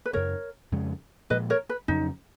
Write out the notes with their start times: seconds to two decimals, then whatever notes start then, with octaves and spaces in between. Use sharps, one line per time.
0.06 B4
0.13 F#2 C#3 G#3 A#4 C#5
0.72 F2 C#3 G#3 C#4
1.30 A#2 F3 G#3 B4 D#5
1.50 A#4 C#5
1.69 B4
1.88 F2 C#3 F#3 C#4 D#4